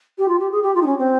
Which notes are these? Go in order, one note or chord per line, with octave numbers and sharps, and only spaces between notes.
G4
F4
G4
G#4
G4
F4
D#4
C#4
C4